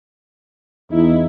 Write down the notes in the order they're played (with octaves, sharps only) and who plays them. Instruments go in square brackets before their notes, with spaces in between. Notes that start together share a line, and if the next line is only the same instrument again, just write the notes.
[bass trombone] E2 [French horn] D#4 [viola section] E4